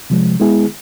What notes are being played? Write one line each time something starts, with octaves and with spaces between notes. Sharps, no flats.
C3 F3 G#3
G#3 B3 E4 G#4